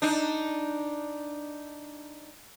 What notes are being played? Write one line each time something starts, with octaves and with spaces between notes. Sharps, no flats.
D4 D#4